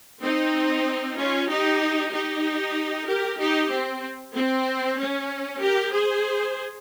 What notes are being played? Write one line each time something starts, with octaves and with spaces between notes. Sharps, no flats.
C4 D#4
C#4 F4
D#4 G4
D#4 G4
G4 A#4
D#4 G4
C4
C4
C#4
G4 A#4
G#4 C5